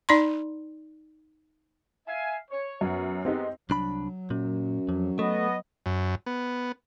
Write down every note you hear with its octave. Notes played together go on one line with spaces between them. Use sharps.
D#4 D5 A#5 C6
E5 F5 G#5
C#5
F#2 B3 C#4 F#4
G#3 B3 C4 D#4 G4 A4
C2 F#3 D4 B5
F#2 A#2
F2 F#3
A3 B3 D#5
F#2
B3